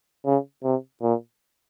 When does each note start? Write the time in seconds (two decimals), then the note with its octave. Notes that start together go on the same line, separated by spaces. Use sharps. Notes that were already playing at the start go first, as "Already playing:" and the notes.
0.25 C#3
0.63 C3
1.02 A#2